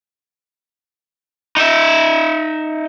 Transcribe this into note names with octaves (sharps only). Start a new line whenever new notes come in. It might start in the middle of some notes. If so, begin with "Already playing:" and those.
D#4 E5